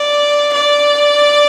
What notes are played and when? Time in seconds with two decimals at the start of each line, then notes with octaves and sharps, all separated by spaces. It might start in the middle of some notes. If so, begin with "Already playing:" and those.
Already playing: D5
0.53 D5